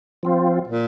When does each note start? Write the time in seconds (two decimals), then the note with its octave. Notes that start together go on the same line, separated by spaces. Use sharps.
0.23 F3 C4 F4
0.68 A#2